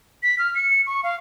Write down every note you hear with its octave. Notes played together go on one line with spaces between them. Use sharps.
B6
F6
C#7
C#6
F5